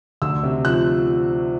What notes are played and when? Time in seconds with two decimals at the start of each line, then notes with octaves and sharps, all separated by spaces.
0.22 D2 E6
0.43 C3
0.65 F3 F#6